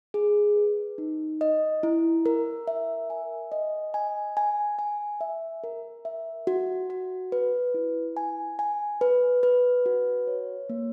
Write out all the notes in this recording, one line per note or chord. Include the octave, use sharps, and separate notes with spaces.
G#4
B4
D#4
D#5
E4
A#4
E5
G#5
D#5
G#5
G#5
G#5
E5
A#4
E5
F#4
F#4
B4
E4
G#5
G#5
B4
B4
F#4
C#5
A#3